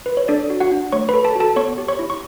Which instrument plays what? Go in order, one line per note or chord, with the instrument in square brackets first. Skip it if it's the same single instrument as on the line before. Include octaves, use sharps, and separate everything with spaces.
[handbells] B4
C#5
D4 A4 D5
F#4
F#4 F#5
D4
A3 C#5 C#6
A4 B4 B5
A4 A5
F#4 A4 A5
B3 C#5 C#6
G4
C#5 C#6
E4
C#6